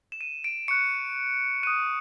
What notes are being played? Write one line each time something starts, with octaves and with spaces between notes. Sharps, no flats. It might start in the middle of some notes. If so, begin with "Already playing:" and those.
E7
D#7
D7
C#6 F#6 C#7
D#6 F#6 D#7